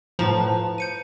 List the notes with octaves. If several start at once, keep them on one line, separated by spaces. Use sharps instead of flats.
A2 F3 B4 A5 A#5
G6 C#7 D#7